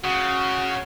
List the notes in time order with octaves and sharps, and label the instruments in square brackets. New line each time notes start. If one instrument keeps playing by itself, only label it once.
[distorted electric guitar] C#3 [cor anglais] F#4